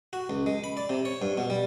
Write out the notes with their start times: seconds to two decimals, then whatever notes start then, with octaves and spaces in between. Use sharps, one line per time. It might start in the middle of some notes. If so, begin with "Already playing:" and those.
0.13 F#4
0.30 C#2
0.46 G#3
0.64 B5
0.77 D5
0.89 C3
1.05 C#5
1.22 G2
1.37 B2
1.50 G3